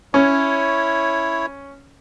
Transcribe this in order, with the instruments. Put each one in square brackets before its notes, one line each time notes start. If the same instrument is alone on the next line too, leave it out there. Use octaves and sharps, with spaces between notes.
[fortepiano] C#4 [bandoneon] E4 C#5